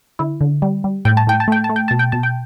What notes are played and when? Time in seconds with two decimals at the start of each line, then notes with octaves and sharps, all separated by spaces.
0.19 D3 E4
0.41 D3
0.62 G3
0.84 G3
1.05 A2 G5
1.17 A5
1.27 A2 G5
1.40 A5
1.48 A3 G5
1.64 A5
1.69 A3
1.76 G5
1.88 B2 A5
1.99 G5
2.12 B2 A5
2.23 G5